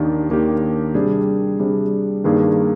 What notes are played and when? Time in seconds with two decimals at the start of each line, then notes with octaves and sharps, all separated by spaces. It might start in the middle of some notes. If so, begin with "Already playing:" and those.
Already playing: D#2 D#3 A#3 D4 G4
0.30 D#2 D#3 A#3 D4 G4
0.94 C3 G3 D4 G#4
1.59 C3 G3 D4 G#4
2.24 G2 D#3 A#3 D4 G#4